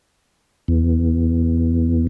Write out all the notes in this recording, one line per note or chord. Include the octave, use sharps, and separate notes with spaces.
E2